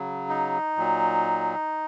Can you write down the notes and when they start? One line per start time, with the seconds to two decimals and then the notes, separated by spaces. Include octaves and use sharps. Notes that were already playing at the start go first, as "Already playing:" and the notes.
Already playing: C#3 F#3
0.29 D#4
0.77 A#2 F#3